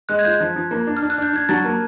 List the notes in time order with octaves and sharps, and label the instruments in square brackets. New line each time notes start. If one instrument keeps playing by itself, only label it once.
[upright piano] G#3 [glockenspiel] F#6
[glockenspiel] G#6
[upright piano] F4 [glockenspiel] G6
[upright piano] F3
F3
A#3
D4
[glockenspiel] F6
[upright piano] D4
[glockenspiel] F#6
[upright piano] D4 [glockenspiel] G6
[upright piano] D4 [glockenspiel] G#6
[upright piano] F#3 [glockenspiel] A5 A6
[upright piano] A#3